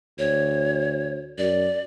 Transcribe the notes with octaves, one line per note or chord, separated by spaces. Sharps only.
D2 C#5
F#2 D5